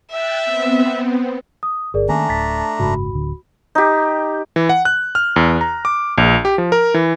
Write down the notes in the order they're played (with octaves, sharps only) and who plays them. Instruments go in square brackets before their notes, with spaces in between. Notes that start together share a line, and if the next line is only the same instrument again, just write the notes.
[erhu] E5 [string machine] G5 F#6 A6
[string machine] B3 C4
[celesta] D#6
[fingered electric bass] G1 [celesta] G#4 A#4 D5
[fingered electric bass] D#3 A#3 C#4 [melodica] A3 D4 A#5 [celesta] G#5
[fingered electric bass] D1 [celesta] A6 B6
[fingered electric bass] F#1 G#2 C#3 [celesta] F#4 B5
[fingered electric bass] D1 D3
[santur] D#4 G4
[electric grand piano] E3
F#5
F#6
F6
E2
A#5
D6
A#1
G4
F3
A#4
E3